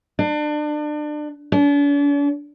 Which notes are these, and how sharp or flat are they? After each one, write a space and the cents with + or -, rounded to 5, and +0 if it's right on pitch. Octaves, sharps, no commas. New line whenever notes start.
D4 +30
D4 -45